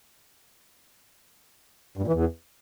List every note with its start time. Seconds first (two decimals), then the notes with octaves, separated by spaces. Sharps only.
1.97 G2
2.02 A#2
2.07 E3
2.13 E2